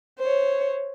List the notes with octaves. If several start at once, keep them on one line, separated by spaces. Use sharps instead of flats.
C5 C#5